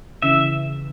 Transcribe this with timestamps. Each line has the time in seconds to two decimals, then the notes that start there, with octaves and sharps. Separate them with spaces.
0.22 C#3 E3 E5